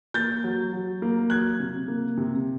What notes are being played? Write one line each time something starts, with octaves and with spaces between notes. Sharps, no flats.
A#3 G6 A6
F#3
F#3
A#3
F#3 F#6 G#6
C3
A#3
C3